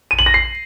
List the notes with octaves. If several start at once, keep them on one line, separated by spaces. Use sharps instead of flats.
D#7
F#7
A#6
C7